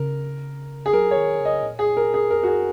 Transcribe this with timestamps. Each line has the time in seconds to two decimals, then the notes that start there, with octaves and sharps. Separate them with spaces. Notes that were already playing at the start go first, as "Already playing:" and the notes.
Already playing: C#3 A#4
0.86 G#4
0.93 F#3 A#4
1.11 C#5
1.17 D#3
1.40 C#3
1.45 D#5
1.63 A#2
1.79 G#4
1.97 A#4
2.14 G#4
2.31 F#2 A#4
2.43 F#4
2.48 G#4